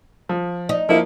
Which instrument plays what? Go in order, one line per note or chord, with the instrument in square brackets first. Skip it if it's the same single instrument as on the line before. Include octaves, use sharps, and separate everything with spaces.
[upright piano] F3
[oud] D#4
[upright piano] F3 A#3 [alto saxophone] E4